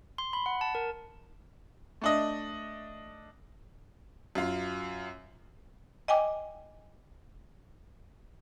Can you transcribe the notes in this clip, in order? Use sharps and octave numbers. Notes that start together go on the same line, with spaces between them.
C6
B5
F#5
A5
A#4
A3 D4 D#5
F#2 F4
D#5 G5 G#5 D6